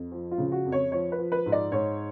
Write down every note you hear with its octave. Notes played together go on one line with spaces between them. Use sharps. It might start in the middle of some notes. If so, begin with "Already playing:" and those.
Already playing: F2
F3
F4
C#3
F#4
F2
C#5
F3 C#5
B4
F3
B4
G#2
D5
G#2 C#5